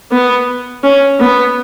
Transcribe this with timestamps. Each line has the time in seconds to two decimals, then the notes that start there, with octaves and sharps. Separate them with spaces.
0.12 B3
0.83 C#4
1.20 B3